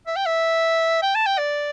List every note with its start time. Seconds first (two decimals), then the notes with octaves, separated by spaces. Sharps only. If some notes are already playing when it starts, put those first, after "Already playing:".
0.07 E5
0.16 G5
0.26 E5
1.02 G5
1.15 A5
1.26 G5
1.38 D5